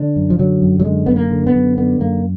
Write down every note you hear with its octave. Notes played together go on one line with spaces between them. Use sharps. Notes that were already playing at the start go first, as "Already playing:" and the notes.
Already playing: D3 D4
F#2
F3
D3 F#3
F#2
F#3
D3 G#3
F#2 B3
A#3
D3
B3
F#2
D3 B3
F#2 A#3